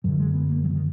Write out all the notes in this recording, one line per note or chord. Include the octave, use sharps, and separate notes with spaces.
F#2 D3 F#3
G#3
B3
A#3
F#3
F3
D#3